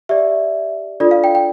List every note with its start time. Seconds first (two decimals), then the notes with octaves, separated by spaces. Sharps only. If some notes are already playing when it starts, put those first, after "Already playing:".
0.09 G4 D5 E5
1.00 D4 F4 A4 D5
1.11 F5
1.24 G5
1.35 G5